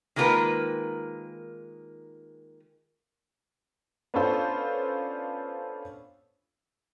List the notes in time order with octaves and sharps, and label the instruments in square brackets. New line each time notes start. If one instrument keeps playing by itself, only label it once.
[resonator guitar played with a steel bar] D#3 G#3 A#3 F4 A#4 B4
[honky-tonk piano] B3 C#4 D4 F4 A4 C5